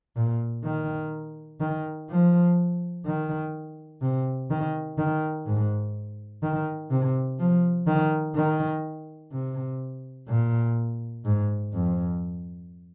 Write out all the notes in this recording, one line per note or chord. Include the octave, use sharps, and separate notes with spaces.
A#2
D#3
D#3
F3
D#3
C3
D#3
D#3
G#2
D#3
C3
F3
D#3
D#3
C3
A#2
G#2
F2